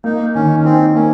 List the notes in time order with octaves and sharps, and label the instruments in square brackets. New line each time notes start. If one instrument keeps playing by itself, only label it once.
[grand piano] A#3 [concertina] D#4
[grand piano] D#3 [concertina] C#4
[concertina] C4 [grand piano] D#4
[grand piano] A#3 [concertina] C#4